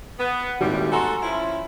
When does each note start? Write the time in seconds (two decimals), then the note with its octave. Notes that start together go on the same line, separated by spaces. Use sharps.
0.19 B3
0.60 D#1 G#1 A2 C3 G3 F#4
0.92 F#4 A4 G#5 A#5 C6
1.23 F3 C#4 E4